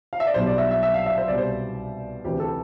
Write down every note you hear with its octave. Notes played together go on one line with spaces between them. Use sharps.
F5
E5
D5
B1 B2 G3 C5
D5
E5
E5
E5
F5
E5
C5
C2 B2 G3 D5
C5
D2 C3 E3 G4
A4